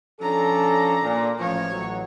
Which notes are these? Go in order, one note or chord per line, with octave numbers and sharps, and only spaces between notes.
F3 C#4 D4 A4 A#5
A#2
A1 F3 C#5
A1 F#3